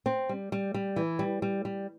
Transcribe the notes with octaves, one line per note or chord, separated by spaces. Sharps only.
C4
G3
G3
G3
E3
G3
G3
G3